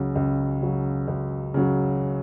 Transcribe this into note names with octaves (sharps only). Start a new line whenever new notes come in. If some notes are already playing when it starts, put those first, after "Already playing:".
Already playing: C#2 C#3 F#3
C#2
C#3 F#3
C#2
C#3 F#3